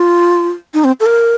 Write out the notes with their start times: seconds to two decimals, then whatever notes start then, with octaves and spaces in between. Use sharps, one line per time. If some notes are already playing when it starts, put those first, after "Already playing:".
Already playing: F4
0.74 D#4
0.84 C4
1.00 A4
1.06 A#4